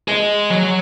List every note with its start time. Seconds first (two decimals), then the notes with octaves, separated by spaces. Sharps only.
0.08 G#4 D#5
0.51 F#3